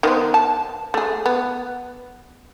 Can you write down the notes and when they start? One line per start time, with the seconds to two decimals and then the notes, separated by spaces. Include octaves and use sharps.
0.03 D#3 B3 C5
0.34 A5
0.94 A3 G#4
1.26 B3